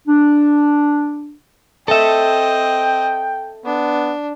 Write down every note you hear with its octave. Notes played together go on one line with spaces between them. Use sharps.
D4
C4 A4 D#5 E5 G5
B3 D4